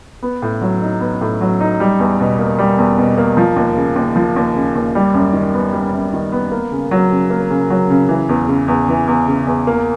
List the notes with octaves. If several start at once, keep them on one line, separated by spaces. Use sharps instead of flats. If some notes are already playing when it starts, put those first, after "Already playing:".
B3
A2
F#3
D#4
B3
A2
F#3
D#4
G3
E2
B2
A#3
G3
E2
B2
A#3
F3
D#2
C#3
D#2
F3
D#2
C#3
D#2
G3
F#2
D#3
B3
G3
F#2
D#3
B3
A#3
C#3
F#3
C#3
A#3
C#3
F#3
C#3
E3
E2
C#3
E2
E3
E2
C#3
E2
A#3